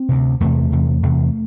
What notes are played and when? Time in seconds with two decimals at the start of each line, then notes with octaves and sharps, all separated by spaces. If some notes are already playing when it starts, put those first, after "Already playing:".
Already playing: C4
0.09 D2 C3
0.40 E2 C3 A3
0.72 E2 C3
1.03 E2 C3